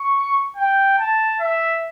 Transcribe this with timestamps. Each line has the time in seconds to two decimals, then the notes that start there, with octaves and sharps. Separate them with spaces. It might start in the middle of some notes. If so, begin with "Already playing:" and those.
Already playing: C#6
0.56 G5
0.98 A5
1.41 E5